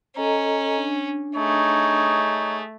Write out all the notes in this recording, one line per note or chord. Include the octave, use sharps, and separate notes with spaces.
C#4 A4 D#5 A#5
D4
A3 D#4 G#4 C#5